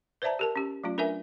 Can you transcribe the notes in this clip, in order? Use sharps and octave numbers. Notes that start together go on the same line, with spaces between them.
B4 C5 D5 E5 A5 A#5
G4 A#4 A5
C#4 G4
F#3 A3 C#4 F4
D4 A#4 B4 E5 G#5